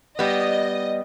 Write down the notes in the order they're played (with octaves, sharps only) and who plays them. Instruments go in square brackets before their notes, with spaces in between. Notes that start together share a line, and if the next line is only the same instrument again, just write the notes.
[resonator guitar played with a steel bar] G3 B3 [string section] D#5